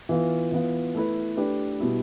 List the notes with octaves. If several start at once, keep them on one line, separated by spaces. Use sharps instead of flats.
E3 B3 F4
E3 B3 F4
A3 E4 B4
A3 D4 G4 B4
B2 G3 B3 E4